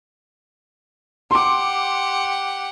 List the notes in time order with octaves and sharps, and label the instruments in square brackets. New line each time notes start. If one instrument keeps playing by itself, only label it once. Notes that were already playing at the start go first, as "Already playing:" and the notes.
[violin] G4 F#5 [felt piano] C6 D6